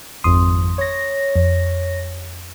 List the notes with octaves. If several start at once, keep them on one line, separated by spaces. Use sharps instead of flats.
G#1 F2 C6 D#6
C#5 A#6
F2